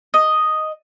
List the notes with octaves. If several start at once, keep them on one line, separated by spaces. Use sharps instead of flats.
D#5